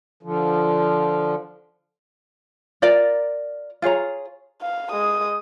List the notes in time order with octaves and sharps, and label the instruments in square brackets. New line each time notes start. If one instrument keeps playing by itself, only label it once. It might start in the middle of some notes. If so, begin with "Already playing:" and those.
[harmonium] D3 F3
[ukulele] F4 A#4 D5 A#5
F4 G#4 C#5 A#5
[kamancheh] F5
G#3 D#6